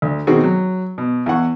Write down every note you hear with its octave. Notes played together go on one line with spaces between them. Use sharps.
D2
B2 D#3 C4 F#4 G#4
F#3
B2
E2 E3 F#5 C#6